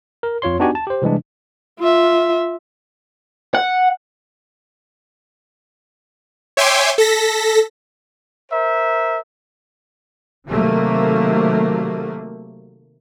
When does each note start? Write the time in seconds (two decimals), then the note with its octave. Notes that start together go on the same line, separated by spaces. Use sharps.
0.23 A#4
0.42 F2 F4 C#5 C6
0.59 B3 D4 D#4 F#4 G4 G#5
0.75 A5
0.87 G4 C5
1.02 C3 E3 G3 G#3 D4
1.80 F4 E5
3.55 F#5
6.57 C#5 E5 G5 G#5 C6 D6
6.98 A4 A#6 B6
8.52 A#4 C5 E5
10.48 C3 D#3 F#3 A3 A#3